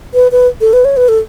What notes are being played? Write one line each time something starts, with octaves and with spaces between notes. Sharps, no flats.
B4
B4
A4
B4
C#5
B4
A4